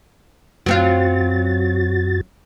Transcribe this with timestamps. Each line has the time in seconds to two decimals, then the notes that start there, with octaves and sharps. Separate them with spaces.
0.66 F#2 F#3 C4 F4 F#4 A6